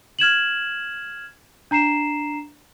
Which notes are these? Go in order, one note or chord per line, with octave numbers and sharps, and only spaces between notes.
F6 G#6 E7 F#7
D4 A#5 C7 E7